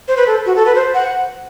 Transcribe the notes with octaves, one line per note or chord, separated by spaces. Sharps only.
C5
B4
A4
F#4
A4
B4
C5
F#5